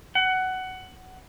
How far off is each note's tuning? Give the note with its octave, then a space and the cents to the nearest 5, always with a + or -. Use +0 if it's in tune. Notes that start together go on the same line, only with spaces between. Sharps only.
F#5 +15